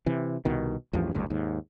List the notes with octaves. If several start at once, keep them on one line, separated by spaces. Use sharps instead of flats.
C3 E3
C2 B2 D#3
A1 E2 G2 F3
F#1 D2 G2
D#2 G#2